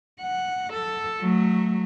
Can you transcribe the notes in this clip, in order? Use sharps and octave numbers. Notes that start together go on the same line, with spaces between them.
F#5
A4
F#3 A3